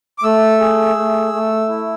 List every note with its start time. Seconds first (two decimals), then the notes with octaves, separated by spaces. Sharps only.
0.18 D6
0.23 A3 E6
0.60 G#4
0.97 A3
1.33 A3
1.69 E4